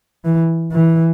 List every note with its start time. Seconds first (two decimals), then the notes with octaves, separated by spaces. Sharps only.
0.25 E3
0.72 E3